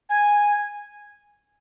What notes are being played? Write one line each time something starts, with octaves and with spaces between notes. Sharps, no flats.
G#5